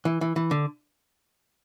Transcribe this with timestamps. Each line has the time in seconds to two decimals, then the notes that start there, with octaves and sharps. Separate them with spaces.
0.05 E3
0.21 E3
0.36 E3
0.51 D3